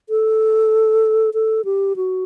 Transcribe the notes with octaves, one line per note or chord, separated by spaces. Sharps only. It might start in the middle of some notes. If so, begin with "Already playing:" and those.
A4
A4
G4
F#4